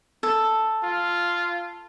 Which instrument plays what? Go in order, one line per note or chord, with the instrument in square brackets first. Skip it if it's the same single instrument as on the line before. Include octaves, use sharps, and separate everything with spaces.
[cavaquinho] A4
[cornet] F4